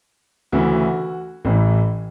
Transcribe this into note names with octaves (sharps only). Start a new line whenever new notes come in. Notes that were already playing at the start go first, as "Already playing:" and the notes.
D2 C#3 E3 F#4
A1 A2 E3